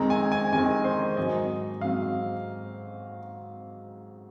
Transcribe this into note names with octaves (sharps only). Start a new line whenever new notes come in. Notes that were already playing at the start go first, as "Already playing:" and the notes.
Already playing: F2 D#3 G#3 C4 A#5
G#5
G#5
F2 D#3 G#3 C4 G#5
C5
G#2 F#3 C4 D#5
G#2 F#3 C4 F5